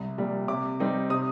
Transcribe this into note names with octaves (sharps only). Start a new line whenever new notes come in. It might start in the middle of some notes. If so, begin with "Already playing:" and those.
Already playing: C2
A#2 G3
C3 D6
G3 C4 D#4
C3 D#6